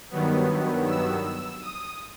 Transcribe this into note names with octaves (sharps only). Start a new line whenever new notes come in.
G2 D#3 F#3 B3
E6
D#6